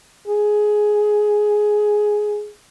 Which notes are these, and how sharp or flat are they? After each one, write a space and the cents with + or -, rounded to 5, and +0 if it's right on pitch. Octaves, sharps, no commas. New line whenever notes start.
G#4 +10